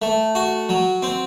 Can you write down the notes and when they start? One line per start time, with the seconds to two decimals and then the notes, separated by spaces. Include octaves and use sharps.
0.02 A3
0.35 F#4
0.69 F#3
1.02 C4